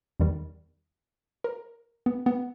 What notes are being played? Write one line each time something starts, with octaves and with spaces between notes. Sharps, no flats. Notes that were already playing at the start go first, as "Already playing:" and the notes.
E2 D#3 G3
A#4
B3
B3